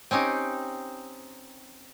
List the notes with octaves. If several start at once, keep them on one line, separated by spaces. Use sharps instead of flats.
C4 C#4 D#4 G4